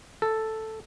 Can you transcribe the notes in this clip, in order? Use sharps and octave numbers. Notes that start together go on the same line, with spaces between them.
A4